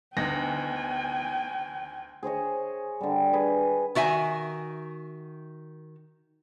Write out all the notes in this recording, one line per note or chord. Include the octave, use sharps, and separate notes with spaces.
D2 B3 D#4 G5 G#5 A#6
G#4 C5 C#5 D#5
D3 G3
G#4 B4 D#5
D#3 F#4 E5 G#5